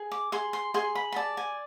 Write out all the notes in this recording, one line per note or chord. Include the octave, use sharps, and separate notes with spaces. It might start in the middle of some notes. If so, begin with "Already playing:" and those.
Already playing: G#4
D6
G#4 C6
C6
G#4 C6
B5
B5
D5 A5
G#5